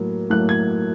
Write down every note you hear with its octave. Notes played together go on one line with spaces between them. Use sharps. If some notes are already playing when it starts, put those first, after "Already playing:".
Already playing: A2 F#3 A#3
A2 F#3 A#3 F#6
G#6